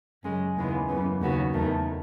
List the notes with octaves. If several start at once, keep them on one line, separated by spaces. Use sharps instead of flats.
F#2 C#3 G#3
D#2 C#3 E3 G#3 B3
F#2 C#3 E3 B3
D#2 C#3 F#3 B3 F#4
E2 D#3 A3